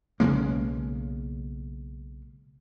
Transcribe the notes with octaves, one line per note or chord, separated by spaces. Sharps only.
B1 C#3 G#3 A#3